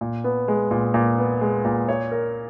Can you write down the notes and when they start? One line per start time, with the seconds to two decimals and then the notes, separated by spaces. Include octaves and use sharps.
0.01 A#2
0.24 B3
0.48 G#3
0.71 A#2
0.94 A#2
1.18 B3
1.41 G#3
1.65 A#2
1.89 C#5
2.11 A#4